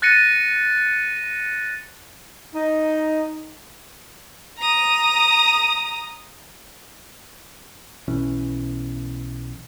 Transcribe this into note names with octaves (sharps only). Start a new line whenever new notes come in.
F#6 A6 A#6 C#7 D#7
D#4
A#5 D#6
B1 E3 C#4